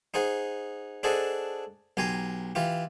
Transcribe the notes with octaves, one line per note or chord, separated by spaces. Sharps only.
D#4 G#4 C5 F#5
D4 G#4 A4 C5 D#5 F#5
B1 G4 G#5 A#5 C6
E3 F4 G4